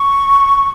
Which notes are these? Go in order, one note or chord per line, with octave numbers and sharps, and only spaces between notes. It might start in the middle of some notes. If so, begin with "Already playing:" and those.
Already playing: C#6